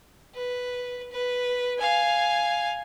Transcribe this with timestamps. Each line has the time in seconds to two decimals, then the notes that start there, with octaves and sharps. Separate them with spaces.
0.35 B4
1.12 B4
1.78 F5 G#5